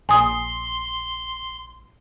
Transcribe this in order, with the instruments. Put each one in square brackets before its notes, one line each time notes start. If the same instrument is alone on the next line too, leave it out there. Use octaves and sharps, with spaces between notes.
[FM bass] A#1 [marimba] G#5 D#6 [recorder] C6